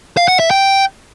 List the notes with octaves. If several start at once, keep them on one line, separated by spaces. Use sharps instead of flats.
F5
F#5
E5
G5